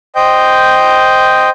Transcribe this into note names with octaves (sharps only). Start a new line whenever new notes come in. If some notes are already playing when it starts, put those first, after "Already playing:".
C5 D#5 G5 G6